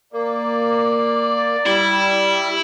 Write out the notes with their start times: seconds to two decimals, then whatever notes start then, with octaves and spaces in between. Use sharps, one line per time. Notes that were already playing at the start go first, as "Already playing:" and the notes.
0.13 A#3 D5
1.66 G3 E4